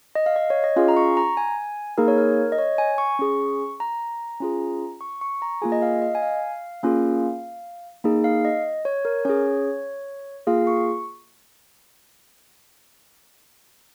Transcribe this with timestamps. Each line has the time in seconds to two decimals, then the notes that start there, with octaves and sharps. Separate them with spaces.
0.15 D#5
0.26 F5
0.36 D#5
0.50 C#5
0.64 D#5
0.76 C#4 F4 G#4 F5
0.88 A#5
0.97 C#6
1.17 A#5
1.37 G#5
1.98 A#3 D#4 G#4 A#4
2.08 C#5
2.18 A#4
2.52 D#5
2.58 C#5
2.78 G#5
2.98 C#6
3.19 C#4 G#4
3.80 A#5
4.40 C#4 F4 G#4
5.01 C#6
5.21 C#6
5.42 A#5
5.62 A#3 F4 G#4 G#5
5.72 D#5
5.82 F5
6.02 D#5
6.15 G#5
6.22 F5
6.83 A#3 C#4 F4 G#4
8.04 A#3 D#4 G#4
8.24 F5
8.45 D#5
8.85 C#5
9.05 A#4
9.25 C#4 G#4 C#5
10.47 A#3 F4 G#4 F5
10.67 C#6